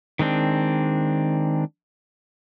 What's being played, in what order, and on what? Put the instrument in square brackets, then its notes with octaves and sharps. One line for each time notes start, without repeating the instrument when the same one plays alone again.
[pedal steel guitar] D#3 G#3 C4 D4